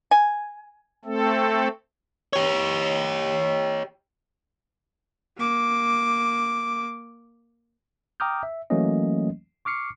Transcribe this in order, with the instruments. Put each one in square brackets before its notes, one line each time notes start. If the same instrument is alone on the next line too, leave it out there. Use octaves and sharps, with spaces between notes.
[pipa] G#5
[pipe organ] A3 C4 A4
[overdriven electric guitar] G4 C#5
[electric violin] A#3 D6
[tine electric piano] G5 A#5 D6 D#6 F6 G6
E5
E3 F#3 A3 A#3 C#4 D#5
C#6 D6 F6 C7 C#7